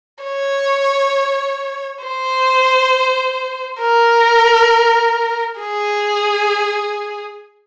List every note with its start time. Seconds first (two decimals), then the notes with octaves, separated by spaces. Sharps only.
0.24 C#5
2.04 C5
3.81 A#4
5.60 G#4